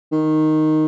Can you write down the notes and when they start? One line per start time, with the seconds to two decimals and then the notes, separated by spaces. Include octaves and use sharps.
0.12 D#3